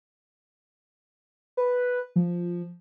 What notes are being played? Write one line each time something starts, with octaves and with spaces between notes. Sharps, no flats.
B4
F3